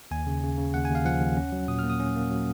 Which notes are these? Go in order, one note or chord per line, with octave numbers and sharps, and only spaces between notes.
D#2 G#5
C#3
C#3
C#3
D#2 F#5
G#5
D#2
F5
F3 F#5
D#2
C#4
F#3
A#2 D#6
F6
A#3
D#6
C#4
A#3
F#3